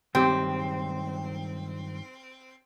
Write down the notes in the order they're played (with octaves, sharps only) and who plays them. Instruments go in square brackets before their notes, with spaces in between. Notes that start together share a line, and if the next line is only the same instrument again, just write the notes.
[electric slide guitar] G2 D#3 F#3 [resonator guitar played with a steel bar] C4 [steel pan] G4 G5